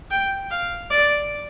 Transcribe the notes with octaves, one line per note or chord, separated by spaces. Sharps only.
G5
F5
D5